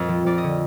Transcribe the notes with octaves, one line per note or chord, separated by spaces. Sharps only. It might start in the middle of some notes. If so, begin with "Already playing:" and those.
Already playing: F2 A#2 D#5
F3
F2 D5
D#5
D3